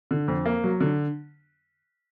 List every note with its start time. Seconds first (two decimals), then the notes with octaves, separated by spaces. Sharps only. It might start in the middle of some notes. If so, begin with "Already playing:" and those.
0.11 D3
0.28 F2
0.46 A#3
0.64 F#3
0.81 D3